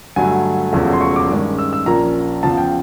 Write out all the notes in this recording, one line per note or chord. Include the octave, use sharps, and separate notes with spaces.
G2 D3 F#3 A3 G#5
E1 E2 C#3 F3 A3
C6
C#6
D6
G2 D#3 G#3 C#4
E6
E6
A#1 A#2 F3 A#3 C#4 A#5
E2 C#3 F3 A5
G5